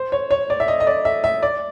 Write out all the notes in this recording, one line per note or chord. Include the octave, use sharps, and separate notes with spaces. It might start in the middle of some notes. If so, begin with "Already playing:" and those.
Already playing: C5
C#5
C#5
D5
E5
D#5
D#5
D5
E5
E5
D5